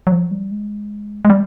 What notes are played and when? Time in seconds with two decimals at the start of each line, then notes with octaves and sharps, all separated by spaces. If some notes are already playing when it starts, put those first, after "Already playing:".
0.07 F#3
0.12 F3
0.31 G3
0.51 G#3
1.25 G#3
1.30 G3